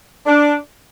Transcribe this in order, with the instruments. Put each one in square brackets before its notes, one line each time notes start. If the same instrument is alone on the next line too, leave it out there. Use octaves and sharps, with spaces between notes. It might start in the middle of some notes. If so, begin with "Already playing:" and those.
[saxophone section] D4